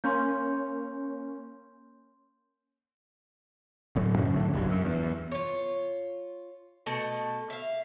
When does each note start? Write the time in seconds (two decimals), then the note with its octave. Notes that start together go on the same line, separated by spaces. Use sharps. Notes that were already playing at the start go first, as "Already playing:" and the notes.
0.04 A#3 C#4 C6 G6
3.96 D1 A2 F#3
4.16 F#2 A2 C#3
4.36 G#2 D3 F#3 A3
4.53 F#1 B1 G2
4.70 F#2
4.85 E2
5.32 F4 C#5
6.86 B2 A3 D#5 A5
7.50 E5 F5